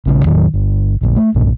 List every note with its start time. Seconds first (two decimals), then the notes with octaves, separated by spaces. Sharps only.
0.06 A#1 C#3
0.25 E2 A2 D#3 F#3
0.54 G1
1.01 F1 A#1
1.16 A3
1.35 B1 G2 A#2